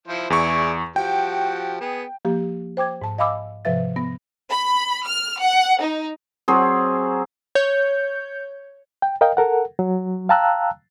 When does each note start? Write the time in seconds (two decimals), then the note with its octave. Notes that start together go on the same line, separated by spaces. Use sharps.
0.08 F3 E4 C5
0.30 E2 E4 G#4 D5 C#6
0.96 F3 F#4 G4 G5
1.81 B3 G#4
2.25 F3 A#3 G4
2.77 C5 G5 D6 G#6
3.02 G#2 A5
3.19 D#5 F5 G#5 B5 D6 E6
3.65 G#2 C3 F3 B4 E5 A6
3.96 B3 A#6
4.52 B5
5.07 F6
5.42 F#5
5.81 D#4
6.48 F#3 C4 G#4
7.55 C#5 G6
9.02 G5
9.21 A#4 D#5 F5 G5
9.37 A4 A#4 F#5
9.79 F#3
10.29 F5 G5 A5 A#5 E6 F#6